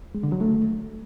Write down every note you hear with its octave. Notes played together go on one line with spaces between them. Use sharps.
G#3
D3
F#3
A3